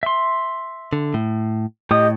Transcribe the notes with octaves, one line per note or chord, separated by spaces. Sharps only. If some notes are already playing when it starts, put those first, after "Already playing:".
E5 C6
D3
A2
A2 G4 D#5 D#6